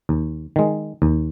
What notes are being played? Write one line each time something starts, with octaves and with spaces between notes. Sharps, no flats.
D#2
D#3 G#3
D#2